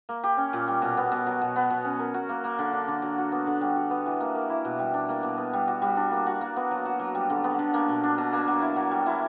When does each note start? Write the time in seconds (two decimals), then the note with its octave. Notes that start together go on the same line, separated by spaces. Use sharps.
0.09 A#3
0.24 G4
0.37 C#4
0.53 A#2
0.68 G3
0.82 B2
0.97 B3
1.12 B2
1.27 F#3
1.41 B2
1.56 B3
1.70 B2
1.85 C#4
1.99 A#4
2.14 F#4
2.29 A#3
2.44 A#3
2.59 D3
2.73 D4
2.88 D3
3.02 F#3
3.18 F#4
3.32 B3
3.47 D3
3.61 G3
3.76 F#4
3.91 B3
4.06 E3
4.20 A#3
4.35 A#4
4.49 E4
4.65 B2
4.79 G3
4.94 D4
5.09 A#3
5.23 B2
5.38 B3
5.53 G3
5.68 F#4
5.82 G3
5.97 D4
6.11 A#3
6.27 F#4
6.41 A#3
6.56 B3
6.71 F#3
6.85 F#4
6.99 F#3
7.15 G3
7.30 D3
7.44 B3
7.59 D3
7.74 A#3
7.88 B2
8.03 D4
8.18 B2
8.33 A#3
8.48 F#3
8.62 E4
8.76 F#3
8.91 G3
9.06 E4